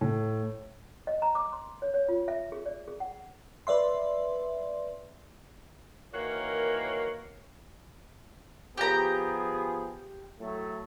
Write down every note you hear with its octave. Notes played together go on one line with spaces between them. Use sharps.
A2
D#5
A#5
D6
C6
C#5
C#5
F4
E5
G#4
D5
G#4
F#5
B4 D5 E5 C6
D#3 E3 A#3 F#4 A#4 C#5
F3 B3 G4 G#4 A#5
A2 F#3 A3